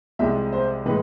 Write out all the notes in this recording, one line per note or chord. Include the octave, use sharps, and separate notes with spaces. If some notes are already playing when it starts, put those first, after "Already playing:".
C2 C3 F3 G#3 E5
C5
A2 E3 G#3 B4